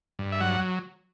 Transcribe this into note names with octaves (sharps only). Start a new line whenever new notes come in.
G2
E5
F#3 F#5